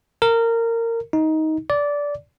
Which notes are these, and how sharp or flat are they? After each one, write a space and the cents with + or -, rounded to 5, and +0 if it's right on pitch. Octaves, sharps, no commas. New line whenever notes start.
A#4 -20
D#4 +15
D5 -15